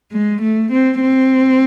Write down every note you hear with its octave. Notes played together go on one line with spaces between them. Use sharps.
G#3
A3
C4
C4